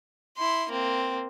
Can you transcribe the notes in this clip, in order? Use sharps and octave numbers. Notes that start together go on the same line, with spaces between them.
E4 C6
A#3 C4